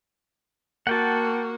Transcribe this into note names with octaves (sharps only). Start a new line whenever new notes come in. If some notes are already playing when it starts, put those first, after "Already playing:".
A#3 F#4 F#5 G5 A5